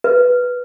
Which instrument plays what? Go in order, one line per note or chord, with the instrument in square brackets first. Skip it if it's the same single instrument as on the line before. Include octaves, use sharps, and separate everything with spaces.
[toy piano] B4